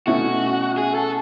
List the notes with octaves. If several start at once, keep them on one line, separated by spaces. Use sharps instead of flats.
B2 A3 C#4 E4 F#4
G#4
A4